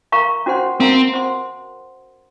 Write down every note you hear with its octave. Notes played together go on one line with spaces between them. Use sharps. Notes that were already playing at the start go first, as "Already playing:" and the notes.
A#4 F5 A#5 C#6
C#4 F#4 C5 F#5 C6
C4 A#4 F5 A#5
C5 F#5 C6